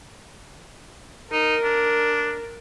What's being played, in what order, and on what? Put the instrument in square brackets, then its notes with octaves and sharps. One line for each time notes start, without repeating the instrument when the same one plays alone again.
[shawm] D#4 [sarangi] A#4
[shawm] D4